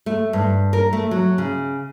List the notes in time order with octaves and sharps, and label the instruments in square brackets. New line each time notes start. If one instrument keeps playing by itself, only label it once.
[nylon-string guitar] A3
G2
A#4
A3
F#3
C#3